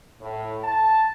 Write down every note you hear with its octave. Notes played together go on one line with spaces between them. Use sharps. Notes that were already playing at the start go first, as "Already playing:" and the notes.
A2
A5